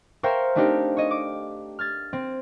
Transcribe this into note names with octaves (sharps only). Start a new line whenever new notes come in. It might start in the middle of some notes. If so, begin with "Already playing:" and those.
A#4 C5 C#5 E5 F5 G5
A3 C4 D4 D#4 G4 A#4
C#5 D#5
D6
F6 G#6 A6
C4